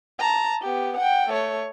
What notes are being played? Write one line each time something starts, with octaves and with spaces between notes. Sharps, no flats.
A5 A#5
B3 G4
F#5 G5
A3 C#5